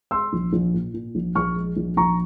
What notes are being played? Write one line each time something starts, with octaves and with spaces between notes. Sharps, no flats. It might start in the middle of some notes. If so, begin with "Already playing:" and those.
G#3 C6 E6
A#1
A#1
A#2
A#2
A#1
A#1 C#6 F6
G#3
A#1
A#1 A#5 C#6